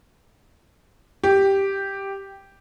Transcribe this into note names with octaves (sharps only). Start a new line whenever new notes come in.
G4